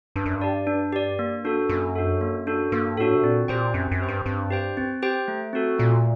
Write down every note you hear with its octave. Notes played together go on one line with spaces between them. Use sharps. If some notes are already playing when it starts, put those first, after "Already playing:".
G2 D4
F#2
G2
G4 D5
D4
G4 D5
A#3
D4 F#4 A4
F#2 A#3
D4 F#4 A4
A#3
D4 F#4 A4
G2 A#3
A2 D4 F#4 A4
C3
A#2 C4
A#2 G4 C5 G5
F#2 C4
F#2
G4 C5 G5
G2
G2 C4
G4 C5 G5
C4
G4 C5 G5
A3
C4 F#4 A4
A#2 A3